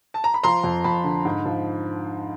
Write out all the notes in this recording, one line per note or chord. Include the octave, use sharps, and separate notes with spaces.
A5
A#5
B5
F3 A#5 C6
F2
F2 A5 B5
D3
G#2
F3